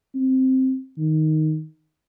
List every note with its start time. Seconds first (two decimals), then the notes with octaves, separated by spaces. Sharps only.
0.15 C4
0.98 D#3